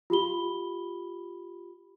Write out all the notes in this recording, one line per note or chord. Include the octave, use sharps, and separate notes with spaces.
F4 G4 B5 G7